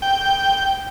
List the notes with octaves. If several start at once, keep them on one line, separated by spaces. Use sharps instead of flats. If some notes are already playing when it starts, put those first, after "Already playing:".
G5